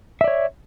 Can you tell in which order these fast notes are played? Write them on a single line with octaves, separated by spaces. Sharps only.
E5 D5 C#5